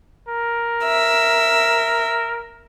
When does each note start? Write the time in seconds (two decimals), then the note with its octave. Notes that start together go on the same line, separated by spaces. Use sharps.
0.28 A#4
0.85 E5